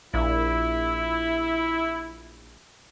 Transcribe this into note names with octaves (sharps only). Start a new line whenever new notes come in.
A#1 E4